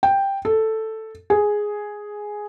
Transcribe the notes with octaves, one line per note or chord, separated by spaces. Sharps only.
G5
A4
G#4